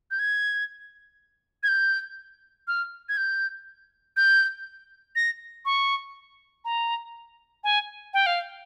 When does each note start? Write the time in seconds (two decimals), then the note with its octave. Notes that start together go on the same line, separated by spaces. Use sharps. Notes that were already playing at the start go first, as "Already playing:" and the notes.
0.11 G6
0.19 G#6
1.63 G#6
1.68 G6
2.68 F6
3.09 G#6
3.17 G6
4.17 G6
5.16 A#6
5.65 C#6
6.65 A#5
7.64 G#5
8.14 G5
8.26 F5